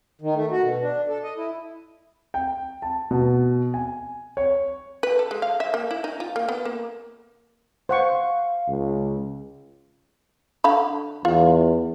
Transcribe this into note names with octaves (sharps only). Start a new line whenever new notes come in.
D#3
A3
F#4
B2
D4
A4
D#5
E4
G5
A5
B2
G#5
C#5
B4
A4
G#3
F5
E5
A#3
E4
D#4
F4
A#3
B3
A#3
C5 F5 F#5 C#6
C#2
D3 F5 B5
E2 F4